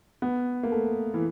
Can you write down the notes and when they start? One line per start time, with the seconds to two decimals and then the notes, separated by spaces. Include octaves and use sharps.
0.22 B3
0.63 A#3
0.72 A3
1.14 E3